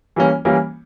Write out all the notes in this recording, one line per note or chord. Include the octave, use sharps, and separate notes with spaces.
E3 G3 A#3 C#4
E3 G3 A#3 C#4